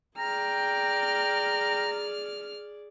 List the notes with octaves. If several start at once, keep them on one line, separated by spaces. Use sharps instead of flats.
G#4 D5 G5 A#5 F6